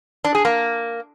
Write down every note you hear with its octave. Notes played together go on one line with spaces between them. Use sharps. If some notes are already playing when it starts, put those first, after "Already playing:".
D4
G#4
A#3